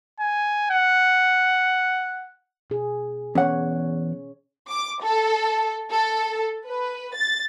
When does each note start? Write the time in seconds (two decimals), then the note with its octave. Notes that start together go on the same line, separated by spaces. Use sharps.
0.20 G#5
0.71 F#5
2.70 B2 G#4
3.35 E2 C#4 C#5 F#5
4.69 D6
5.02 A4
5.91 A4
6.66 B4
7.15 A6